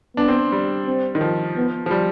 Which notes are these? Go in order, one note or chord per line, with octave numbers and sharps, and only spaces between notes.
B3 D4
C4
G3
C4
D#3
F3
B3
F3
G3